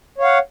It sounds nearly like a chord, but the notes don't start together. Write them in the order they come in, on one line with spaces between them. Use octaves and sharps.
C#5 F5 F#5